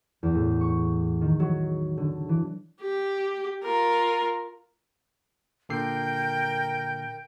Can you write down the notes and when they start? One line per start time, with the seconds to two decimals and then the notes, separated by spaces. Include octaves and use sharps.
0.23 E2
0.34 A2
0.61 C#6
1.21 D#3
1.40 F#3
1.97 D3
2.29 E3
2.81 G4
3.64 F4 A#4
5.69 A#2 D3 A#4 G5 G6 C7